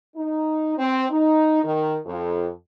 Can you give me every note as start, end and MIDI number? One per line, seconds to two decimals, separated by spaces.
0.16 0.73 63
0.78 1.04 60
1.10 1.60 63
1.64 1.96 51
2.06 2.49 41